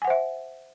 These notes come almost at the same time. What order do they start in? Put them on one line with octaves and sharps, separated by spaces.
G#5 F#5 C5 E5